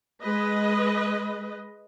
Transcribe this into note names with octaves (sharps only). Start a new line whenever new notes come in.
G#3 B4 D#5